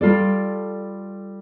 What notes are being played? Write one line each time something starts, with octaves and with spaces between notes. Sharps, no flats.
G3 F4 A4 D5